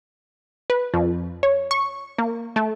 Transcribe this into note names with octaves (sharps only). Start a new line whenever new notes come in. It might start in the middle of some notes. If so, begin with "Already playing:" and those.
B4
F2
C#5
C#6
A#3
A3